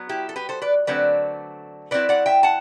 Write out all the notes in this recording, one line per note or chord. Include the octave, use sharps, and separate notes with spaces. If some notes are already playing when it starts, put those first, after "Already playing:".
Already playing: F#3 B3
E4 G4
A4
G4 B4
A4 C5
B4 D5
D3 F#3 A3 C4 B4 D5
D3 F#3 C4 E4 B4 D5
D5 F#5
E5 G5
F#5 A5